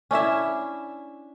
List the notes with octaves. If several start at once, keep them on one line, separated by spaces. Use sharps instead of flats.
C#4 D4 E4 E5